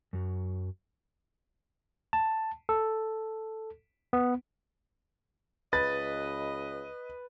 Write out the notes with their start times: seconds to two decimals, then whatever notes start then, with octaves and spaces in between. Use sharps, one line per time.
0.13 F#2 F#3
2.13 A5
2.69 A4
4.13 B3
5.73 C#2 B4 D#5 A6